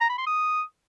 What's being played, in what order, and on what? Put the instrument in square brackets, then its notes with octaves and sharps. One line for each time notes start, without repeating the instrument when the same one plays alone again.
[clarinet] A#5
B5
C6
D#6